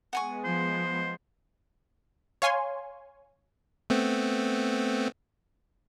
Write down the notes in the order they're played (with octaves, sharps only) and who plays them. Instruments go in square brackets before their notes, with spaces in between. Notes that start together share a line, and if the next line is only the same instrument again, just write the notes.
[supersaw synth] G#3 B3 [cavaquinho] F#5 G#5 C#6
[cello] F3 [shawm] C5
[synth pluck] C#5 F5 G#5 C6
[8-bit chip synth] A3 B3 C4